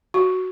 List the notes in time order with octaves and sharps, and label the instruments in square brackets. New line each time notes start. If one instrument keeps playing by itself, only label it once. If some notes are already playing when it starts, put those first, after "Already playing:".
[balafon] F#4